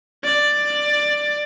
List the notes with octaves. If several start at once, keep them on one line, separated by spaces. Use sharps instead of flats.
D5